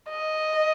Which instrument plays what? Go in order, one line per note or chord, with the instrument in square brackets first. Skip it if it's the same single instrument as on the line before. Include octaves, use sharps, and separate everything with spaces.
[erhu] D#5